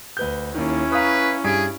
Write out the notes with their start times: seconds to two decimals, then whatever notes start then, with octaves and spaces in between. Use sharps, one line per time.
0.17 D2 B4 G6
0.55 D#2 D#3 C#4 E4
0.92 B4 F5 A#5 D#6
1.44 G2 G#4 B6 D7